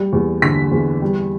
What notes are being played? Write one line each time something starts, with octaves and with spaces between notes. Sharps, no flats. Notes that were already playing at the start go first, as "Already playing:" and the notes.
Already playing: G3
E2
D3 B6
E2
G3